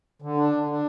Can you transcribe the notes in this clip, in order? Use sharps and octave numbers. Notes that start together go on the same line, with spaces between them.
D3
D4
D3
D4